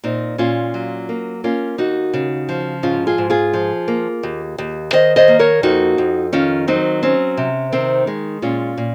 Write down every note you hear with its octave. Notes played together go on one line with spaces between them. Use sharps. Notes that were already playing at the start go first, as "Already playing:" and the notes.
A#2 C4 D#4
A#2 C#4 F4
F#3
A#3
A#3 C#4 F4
D#2 D#4 F#4
C#3
F3
G#2 C#4 F4
F4 G#4
G#2
F4 G#4
F3
A#3
D#2
D#2
D#3 C5 D#5
C5 D#5
A#3
A#4 C#5
F2 D#4 F#4
F2
D#3 C#4 F4
F#3 C4 D#4
C4 C#4
C3
D#3 C4 D#4
G#3
A#2 C#4 F4
A#2